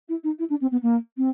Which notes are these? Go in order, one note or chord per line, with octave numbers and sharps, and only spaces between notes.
E4
D#4
E4
D4
C4
B3
A#3
C4